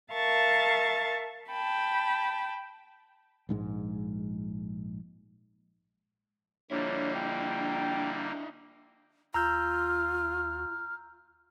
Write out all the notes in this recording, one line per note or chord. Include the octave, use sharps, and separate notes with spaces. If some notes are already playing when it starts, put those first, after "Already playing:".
A#4 E5 F5 A5 C#6 A6
G5 A5 B5
A#1 G#2 D#3 G#3
A#1 D3 G3 A#3 D4 E4 C#5
G5
D#2 F4 A#5 E6 F6 G6